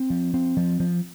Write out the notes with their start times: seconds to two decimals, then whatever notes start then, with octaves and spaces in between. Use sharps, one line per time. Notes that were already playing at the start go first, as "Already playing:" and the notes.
Already playing: C4
0.10 F3
0.34 C4
0.57 F3
0.80 F3